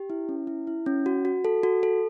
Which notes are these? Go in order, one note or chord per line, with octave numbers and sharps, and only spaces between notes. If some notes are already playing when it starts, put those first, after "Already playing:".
Already playing: G4
E4
C#4
E4
E4
C#4
F#4
F#4
A4
F#4
A4